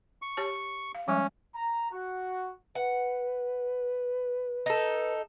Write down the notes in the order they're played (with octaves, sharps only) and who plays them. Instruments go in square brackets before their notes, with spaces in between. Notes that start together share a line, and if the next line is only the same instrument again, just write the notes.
[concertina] C#6
[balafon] G4 C#5 A5
F5
[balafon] F3 G3 G#3 [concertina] C#4
[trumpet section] A#5
F#4
[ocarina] B4 [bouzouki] F#5
[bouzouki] D#4 A4